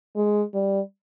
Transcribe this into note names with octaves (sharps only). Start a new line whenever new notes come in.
G#3
G3